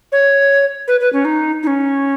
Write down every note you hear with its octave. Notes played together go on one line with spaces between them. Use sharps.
C#5
B4
B4
C#4
D#4
D#4
C#4